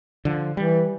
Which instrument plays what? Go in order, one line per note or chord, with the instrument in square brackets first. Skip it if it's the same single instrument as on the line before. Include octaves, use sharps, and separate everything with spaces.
[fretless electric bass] D3 F3
[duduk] E3 [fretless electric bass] G3